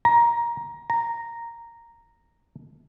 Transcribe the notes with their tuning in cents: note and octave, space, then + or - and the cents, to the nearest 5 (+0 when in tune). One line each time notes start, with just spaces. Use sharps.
A#5 +15
A#5 -5